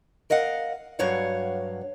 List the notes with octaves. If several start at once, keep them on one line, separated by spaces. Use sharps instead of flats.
A#4 D#5 F5 F#5
G2 F#3 C#5 F5 F#5